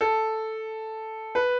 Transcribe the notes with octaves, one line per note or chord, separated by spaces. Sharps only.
A4
B4